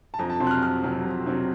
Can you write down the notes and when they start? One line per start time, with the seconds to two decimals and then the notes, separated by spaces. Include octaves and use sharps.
0.14 A5
0.19 F2 A#5
0.30 A5
0.40 C3 F#3 C4 C6
0.47 F#6
0.51 F6
0.62 F2 F6
0.83 C3 F#3 C4
1.05 F2
1.26 C3 F#3 C4